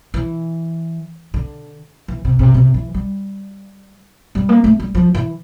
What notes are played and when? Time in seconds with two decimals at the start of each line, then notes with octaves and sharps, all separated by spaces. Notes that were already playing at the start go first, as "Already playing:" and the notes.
0.14 E3
1.34 D3
2.08 E3
2.25 C3
2.39 C3
2.54 C3
2.74 E3
2.94 G3
4.35 G3
4.49 A#3
4.64 A3
4.79 G3
4.95 F3
5.15 E3